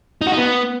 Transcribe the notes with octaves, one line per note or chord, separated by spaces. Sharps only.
D#4
F#4
D#4
B3